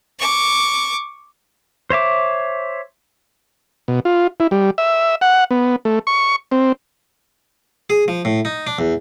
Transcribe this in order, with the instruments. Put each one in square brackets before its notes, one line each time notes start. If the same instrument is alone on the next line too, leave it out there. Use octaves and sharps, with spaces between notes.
[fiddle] C#6 D6
[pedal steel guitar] C5 C#5 E5 D6
[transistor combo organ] B2
F4
E4
G3
E5
F#5
B3
A3
C#6
C4
[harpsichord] G#4
F3
A2
D#4
D4
E2